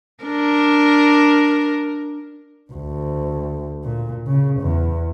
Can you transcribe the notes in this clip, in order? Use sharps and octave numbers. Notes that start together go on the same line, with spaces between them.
D4 A#4
D2
A#2
C#3
E2